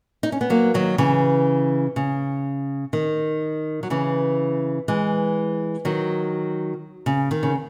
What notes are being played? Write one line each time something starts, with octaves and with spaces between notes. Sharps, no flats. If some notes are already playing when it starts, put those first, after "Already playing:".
D#4
C#4
B3
F#3 A#3
D#3 F#3
C#3 E3
C#3
D#3
F#3
C#3 E3
E3 G#3
D#3 F#3
C#3
D#3
C#3